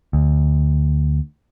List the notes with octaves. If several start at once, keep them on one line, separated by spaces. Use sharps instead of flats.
D2